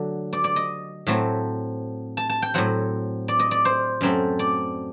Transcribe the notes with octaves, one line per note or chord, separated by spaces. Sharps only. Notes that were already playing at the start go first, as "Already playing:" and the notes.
Already playing: D3 F#3 A3
D5
D5
D#5
A2 F#3 A3 C4
A5
A5
G5
A2 F#3 C4 F#5
D5
D#5
D5
C5
F#2 F#3 A3 C4
D5